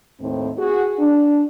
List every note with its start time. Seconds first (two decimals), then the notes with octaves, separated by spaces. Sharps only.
0.20 D#2 A2 C4
0.57 F#4 G#4
0.99 D4